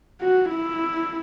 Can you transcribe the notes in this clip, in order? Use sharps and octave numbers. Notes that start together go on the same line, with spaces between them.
F#4
E4